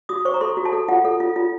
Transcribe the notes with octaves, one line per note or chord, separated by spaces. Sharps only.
F#4 D#6
C5 C#6
A#5
A4 C6
F#4
A5
A4
F4 F#5
A4
F4
F4